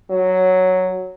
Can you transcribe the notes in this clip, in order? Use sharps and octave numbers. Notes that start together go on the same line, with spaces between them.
F#3